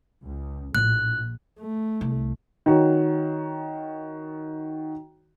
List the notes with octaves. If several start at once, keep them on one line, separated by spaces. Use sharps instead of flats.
C#2
A#1 A2 F4 F#6
A3
C2
D#3 F#4 C#5